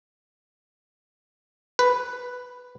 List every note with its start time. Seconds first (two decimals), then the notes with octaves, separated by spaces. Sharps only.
1.79 B4